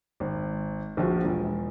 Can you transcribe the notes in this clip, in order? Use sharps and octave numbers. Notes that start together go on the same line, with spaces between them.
G#1
A#1 F3 F#4
E1